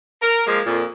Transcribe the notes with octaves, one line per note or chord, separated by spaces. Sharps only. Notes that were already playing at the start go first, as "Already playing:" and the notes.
A#4
F3 G#3 A#3
F2 A#2